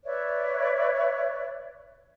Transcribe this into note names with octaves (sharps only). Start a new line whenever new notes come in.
B4 C#5 D5 E5